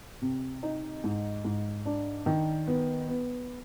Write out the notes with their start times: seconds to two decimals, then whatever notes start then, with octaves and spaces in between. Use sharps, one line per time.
0.22 C3
0.63 D#4
1.04 G#2
1.44 G#2
1.85 D4
2.26 D#3
2.67 B3
3.08 B3